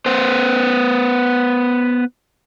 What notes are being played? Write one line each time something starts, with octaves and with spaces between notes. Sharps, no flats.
B3 C5